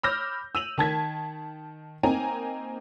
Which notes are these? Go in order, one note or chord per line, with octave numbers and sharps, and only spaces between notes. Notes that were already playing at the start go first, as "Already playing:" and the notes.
B5 D6 E6 F6 G6 A#6
E6 D#7 F7 F#7
D#3 A5 G#6 B6
A#3 C4 D#4 G#5 A#5